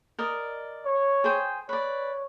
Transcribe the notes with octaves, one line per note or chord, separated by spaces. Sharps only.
A#4 D5 D#5
C#5
G#4 C5 G5
B4 C#5 D5